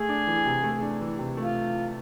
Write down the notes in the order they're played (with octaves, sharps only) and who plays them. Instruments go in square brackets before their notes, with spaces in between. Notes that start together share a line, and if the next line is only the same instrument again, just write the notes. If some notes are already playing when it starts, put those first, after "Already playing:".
Already playing: [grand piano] A3 [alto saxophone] G#4
[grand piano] D4
E3
C3
A3
D4
E3
C3
[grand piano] A3 [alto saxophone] F4